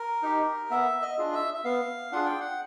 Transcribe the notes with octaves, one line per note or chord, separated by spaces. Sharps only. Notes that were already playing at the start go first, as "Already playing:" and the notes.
Already playing: A#4
D#4 G4
B3 E5
D#5
D4 F4 G#4
E5
E5
B3 F5
D4 F4 G#4 F#5
G5
F#5